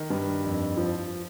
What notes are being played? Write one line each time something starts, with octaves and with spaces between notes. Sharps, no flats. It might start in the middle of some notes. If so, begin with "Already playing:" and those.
Already playing: D#3
G2
F2
F3